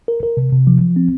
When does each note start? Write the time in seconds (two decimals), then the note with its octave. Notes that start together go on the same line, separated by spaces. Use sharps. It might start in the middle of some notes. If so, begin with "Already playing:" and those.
0.08 A#4
0.23 A#4
0.37 C3
0.52 C3
0.67 F3
0.81 F3
0.96 C4